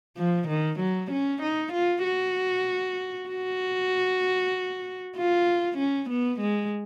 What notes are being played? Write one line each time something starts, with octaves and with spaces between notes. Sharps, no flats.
F3
D#3
F#3
C#4
D#4
F4
F#4
F#4
F4
C#4
B3
G#3